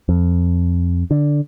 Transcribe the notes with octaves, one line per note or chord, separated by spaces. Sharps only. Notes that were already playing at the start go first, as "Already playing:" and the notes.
F2
D3